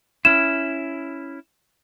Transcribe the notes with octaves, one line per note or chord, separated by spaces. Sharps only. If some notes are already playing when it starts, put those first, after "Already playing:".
C#4 E4 E7